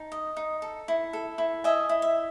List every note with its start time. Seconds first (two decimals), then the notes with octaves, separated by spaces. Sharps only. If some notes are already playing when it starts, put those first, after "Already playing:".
Already playing: D#4 A5
0.12 D#5
0.37 D#4
0.62 A4
0.88 E4
1.13 A4
1.38 E4
1.64 D#5 E5 G#5
1.89 E4
2.02 E5